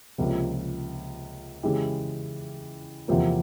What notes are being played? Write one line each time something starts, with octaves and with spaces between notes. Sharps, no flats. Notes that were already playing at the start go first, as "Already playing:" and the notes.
C#2 C3 F3 A#3
C#3 E3 G#3 E4 G4
E2 C3 F3 A#3